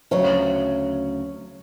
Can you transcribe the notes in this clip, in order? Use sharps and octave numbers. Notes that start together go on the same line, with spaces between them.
D2 C#3 F#3 C#4 C#5